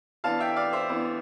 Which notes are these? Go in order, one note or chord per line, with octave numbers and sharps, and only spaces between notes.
E3 B3 D4 F5 A5
E5 G5
D5 F5
C5 E5
E3 B3 D4